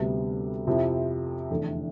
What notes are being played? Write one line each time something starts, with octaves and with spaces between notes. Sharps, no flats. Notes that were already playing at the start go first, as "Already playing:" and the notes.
Already playing: D2 C3 G3 B3
F2 C3 F3 C4 E4
F1 E2 D3 A3